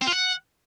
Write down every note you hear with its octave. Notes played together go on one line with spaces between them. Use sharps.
C4
F4
F#5